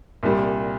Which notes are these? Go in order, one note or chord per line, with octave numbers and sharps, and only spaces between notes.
C2 A#2 G3